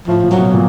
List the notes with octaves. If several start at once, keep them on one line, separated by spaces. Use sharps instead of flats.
A2 F3
A#2
F#3
B2
A#2